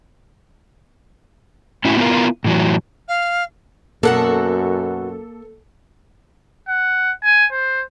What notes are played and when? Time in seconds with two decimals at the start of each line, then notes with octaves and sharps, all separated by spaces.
1.85 A2 C#4 E4 F#4
1.97 B3 D4 E4 F4 A#4
2.44 A2 E3 F#3
3.08 F5
4.03 F#2 B2 A#3 F#4 A4 F#5
6.68 F#5
7.24 G#5
7.52 C5